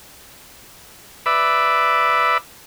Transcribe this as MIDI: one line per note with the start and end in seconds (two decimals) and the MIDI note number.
1.26 2.38 71
1.26 2.38 74
1.26 2.38 76